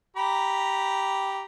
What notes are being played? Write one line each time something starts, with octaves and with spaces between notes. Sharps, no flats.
G4 A#5 B5